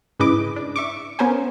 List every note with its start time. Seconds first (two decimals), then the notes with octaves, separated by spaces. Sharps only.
0.20 G#2 C#3 E4 B4 D#5 D6
0.56 D4
0.76 E5 C#6 D6
1.19 B3 C#4 A#4 C5 G#5